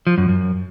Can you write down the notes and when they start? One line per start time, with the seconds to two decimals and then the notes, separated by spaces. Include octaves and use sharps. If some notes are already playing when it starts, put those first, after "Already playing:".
0.07 F3
0.18 F#2
0.29 F#2